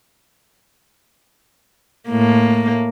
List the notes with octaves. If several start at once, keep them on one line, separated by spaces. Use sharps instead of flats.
A2 A#3